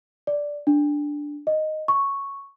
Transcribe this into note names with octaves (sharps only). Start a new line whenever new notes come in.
D5
D4
D#5
C#6